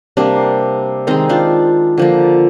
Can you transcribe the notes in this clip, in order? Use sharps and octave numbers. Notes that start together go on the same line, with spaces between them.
C3 G3 A#3 D4
D#3 G#3 C4 D#4
D4 F4
D3 F3 A#3